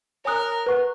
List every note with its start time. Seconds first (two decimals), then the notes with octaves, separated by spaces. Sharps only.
0.25 A#4 C#5 G#5 D#6 F#6
0.66 B4 F#5 C#6 F#6